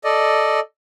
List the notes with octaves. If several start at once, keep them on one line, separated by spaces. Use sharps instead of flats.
A4 D5 D#5